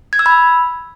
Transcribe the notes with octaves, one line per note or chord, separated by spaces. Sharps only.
G#6
E6
B5